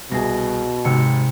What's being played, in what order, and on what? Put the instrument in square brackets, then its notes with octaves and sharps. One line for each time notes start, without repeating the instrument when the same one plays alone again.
[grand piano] C2 G#4 [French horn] B2 [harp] A#6
[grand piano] G#1 [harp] C3 E6 C#7